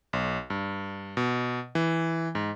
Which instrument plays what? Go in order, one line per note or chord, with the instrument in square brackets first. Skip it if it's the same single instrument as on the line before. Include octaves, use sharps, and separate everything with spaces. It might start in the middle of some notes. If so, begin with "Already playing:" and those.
[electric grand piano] B1
G2
B2
E3
G#2